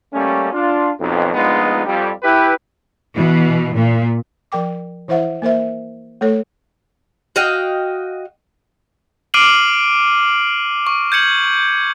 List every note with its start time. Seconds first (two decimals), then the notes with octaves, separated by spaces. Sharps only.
0.13 G3 A3 A#3 C#4
0.52 D4 F4
1.00 B1 F2
1.33 A#1 G2 G#3 B3 D#4 F4
1.86 F2 G3
2.23 E4 G4 B4
3.15 B2 E3
3.74 A#2
4.52 F3 A#4 G5 D6
5.08 E3 E4 C5 E5 F#5
5.42 A#3 A#4 C5 E5
6.21 A3 A4 C#5
7.36 F#4 D#5 F5 G5
9.34 D6 F6 C7 D7 D#7 F#7
10.87 C#6
11.12 G6 G#6 C#7 F#7